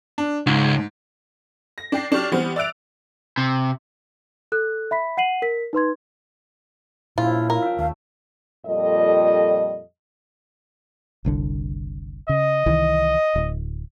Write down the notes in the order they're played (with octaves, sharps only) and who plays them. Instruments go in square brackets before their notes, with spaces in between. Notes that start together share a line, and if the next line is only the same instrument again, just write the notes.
[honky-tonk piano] D4
[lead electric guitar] C#2 [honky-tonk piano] G#2
[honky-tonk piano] A#6
D4 G5 C7
F#3 D4 G4 C#6 F6
E3 G3 B3 C4 C5
D5 E5 E6 F#6 D7 F7
[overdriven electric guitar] C3
[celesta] A4 F#6
E5 B5 B6
F#5 C7 D#7 F#7
A#4 B6
D#4 B4 C6 G#6
[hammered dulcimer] G2 C#3 F3 [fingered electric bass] A#2 [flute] E4 [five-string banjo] F4
[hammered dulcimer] F4 [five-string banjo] A#4
[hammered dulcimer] E5 G5
[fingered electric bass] D#2 [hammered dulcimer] A3 [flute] F5
[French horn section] F2 A#2 G3 A4 D#5
[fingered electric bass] F#1 C2 D3
[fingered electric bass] C#3 [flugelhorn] D#5
[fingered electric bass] C2 D#3 E3
D1